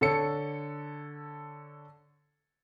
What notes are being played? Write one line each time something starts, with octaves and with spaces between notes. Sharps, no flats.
D3 A4 C#5 C#7